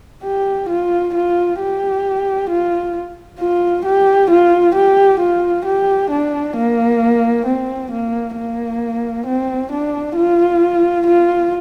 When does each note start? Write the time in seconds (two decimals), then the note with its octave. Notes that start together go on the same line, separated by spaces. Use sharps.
0.24 G4
0.69 F4
1.15 F4
1.60 G4
2.50 F4
3.40 F4
3.85 G4
4.30 F4
4.75 G4
5.20 F4
5.65 G4
6.11 D4
6.56 A#3
7.46 C4
7.91 A#3
8.36 A#3
9.26 C4
9.72 D4
10.16 F4
11.07 F4